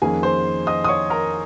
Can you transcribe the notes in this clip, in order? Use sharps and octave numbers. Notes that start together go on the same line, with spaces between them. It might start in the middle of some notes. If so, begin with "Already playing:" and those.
F2 D#3 A#3 C#4 G#4 G#5
C5 C6
D#5 D#6
D#6
C#5 C#6
A#4 A#5